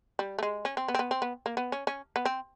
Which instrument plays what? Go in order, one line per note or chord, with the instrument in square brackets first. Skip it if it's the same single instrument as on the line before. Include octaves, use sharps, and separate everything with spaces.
[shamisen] G3
A3
G#3
C#4
C4
B3
C4
B3
C4
B3
A#3
B3
C#4
C#4
B3
C4